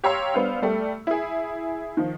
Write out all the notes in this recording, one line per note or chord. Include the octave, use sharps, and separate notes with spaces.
G4 C#5 F5 A#5 C6 E6
G3 B3 D4 C5 F5
G3 A3 G4
E4 G#4
D#3 F3